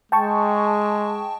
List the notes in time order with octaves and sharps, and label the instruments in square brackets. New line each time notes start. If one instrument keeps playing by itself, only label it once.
[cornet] G#3 [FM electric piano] G5 A5 C#6